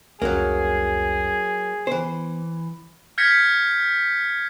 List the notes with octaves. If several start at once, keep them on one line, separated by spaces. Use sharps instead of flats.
C2 F2 F#3 A#3 C#4 G#4
E3 B3 C5
F6 G6 G#6 A#6 B6 C#7